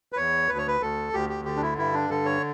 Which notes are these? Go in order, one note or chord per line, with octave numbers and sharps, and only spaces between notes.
B4
E2 C#5
D2 B4
C#5
B4
D2 A4
D2 G4
G4
D3 G4
D4
E4
G2 E4
D4
D3 A4
C#5